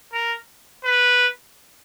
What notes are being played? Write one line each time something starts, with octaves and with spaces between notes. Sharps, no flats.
A#4
B4